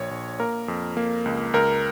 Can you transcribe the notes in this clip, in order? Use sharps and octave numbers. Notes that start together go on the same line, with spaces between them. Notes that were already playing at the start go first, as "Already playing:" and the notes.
Already playing: A#1 C#5
A#1
A#3 A#4
F2
A#3
C#2
C#2 A#4